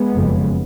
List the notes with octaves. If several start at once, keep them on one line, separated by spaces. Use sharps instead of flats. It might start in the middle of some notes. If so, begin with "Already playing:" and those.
Already playing: G#3 B3
F#1 F2 C#3